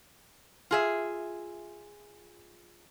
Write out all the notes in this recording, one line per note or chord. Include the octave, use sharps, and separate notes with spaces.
F4 G#4 E5